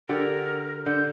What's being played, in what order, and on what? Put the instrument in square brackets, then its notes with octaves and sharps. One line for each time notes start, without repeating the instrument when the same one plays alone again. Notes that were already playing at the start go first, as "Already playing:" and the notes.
[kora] D3 G4 D5 [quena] A#4
[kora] D3 [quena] G6